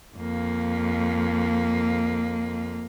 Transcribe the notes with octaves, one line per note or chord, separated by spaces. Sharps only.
F2 A#3